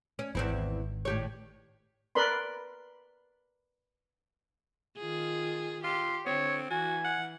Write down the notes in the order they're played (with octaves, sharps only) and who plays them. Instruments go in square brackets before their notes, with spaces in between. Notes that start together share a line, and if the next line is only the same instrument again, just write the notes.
[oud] C#4
[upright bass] G#1 D#3 [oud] E2 C4 E4
[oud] A2 G4 C#5
[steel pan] A#4 B4 D5 B5 C6
[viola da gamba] D#3 F4 G#4
[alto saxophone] F4 [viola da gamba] G4 [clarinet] C6
[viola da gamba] D3 [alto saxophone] C4 [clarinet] C#5
[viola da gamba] E3 [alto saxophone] F#4 [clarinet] G#5
[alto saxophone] F#5